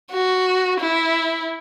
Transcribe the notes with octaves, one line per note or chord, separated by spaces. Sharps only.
F#4
E4